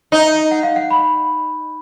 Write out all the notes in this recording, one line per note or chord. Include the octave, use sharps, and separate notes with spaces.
D#4
F#5
F5
F#5
B5